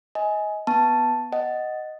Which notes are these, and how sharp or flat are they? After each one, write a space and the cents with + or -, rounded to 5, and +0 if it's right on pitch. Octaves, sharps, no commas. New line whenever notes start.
D#5 +25 G#5 +10
B3 -5 A5 +0
D#5 +0 F#5 +15